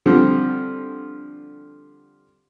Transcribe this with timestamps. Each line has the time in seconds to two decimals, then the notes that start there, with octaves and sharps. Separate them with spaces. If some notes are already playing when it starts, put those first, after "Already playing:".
0.06 D3 F3 G3 C4